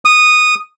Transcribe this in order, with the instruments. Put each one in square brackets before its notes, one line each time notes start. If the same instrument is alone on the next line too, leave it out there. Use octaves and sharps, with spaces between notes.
[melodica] D#6